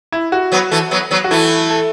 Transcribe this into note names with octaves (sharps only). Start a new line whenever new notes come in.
E4
F#4
F#3 B3
E3 A3
F#3 B3
F#3 B3
F#4
E3 A3 E4
A4